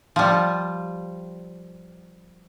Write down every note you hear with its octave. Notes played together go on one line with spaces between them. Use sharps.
F3 G3